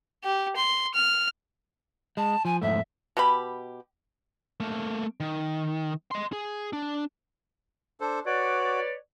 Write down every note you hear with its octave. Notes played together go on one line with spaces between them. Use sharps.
G4
C6
F6
G#3 A5
F3 G#5
F2 G#2 A3 E5
B2 G4 B5
A3 A#3
D#3
D#5 C6
G#4
D4
D4 A4 C5
F#4 B4 C#5 D5